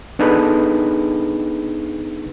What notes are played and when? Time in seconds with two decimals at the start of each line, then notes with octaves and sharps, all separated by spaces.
0.19 B3 D4 D#4 G#4 A4 B4